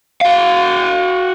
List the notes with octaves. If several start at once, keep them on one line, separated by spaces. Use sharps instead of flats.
F#4 F5